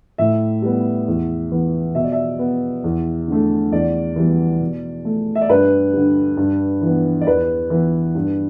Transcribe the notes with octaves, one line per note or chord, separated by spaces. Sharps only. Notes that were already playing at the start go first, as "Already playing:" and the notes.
A2 E5
G3 B3
E2
E3 B3
B2 E5
D5
E5
B3
E2
D3 A3
E2 D5
E3 G3 B3
B2
A3
E5
D5
G2 B4
D3 G3
G2
E3
B3
D5
E2 B4
E3 B3
G2